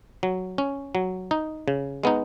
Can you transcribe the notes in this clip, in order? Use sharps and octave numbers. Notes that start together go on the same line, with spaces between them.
F#3
C#4
F#3
D#4
C#3
G#3 B3 D#4